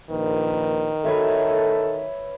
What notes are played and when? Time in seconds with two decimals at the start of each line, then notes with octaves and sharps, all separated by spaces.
0.11 A#1 D#2 D#3 B4
1.04 A4 B4 C#5 E5